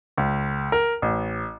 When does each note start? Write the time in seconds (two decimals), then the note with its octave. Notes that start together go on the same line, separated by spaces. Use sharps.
0.18 C#2
0.72 A#4
1.02 A1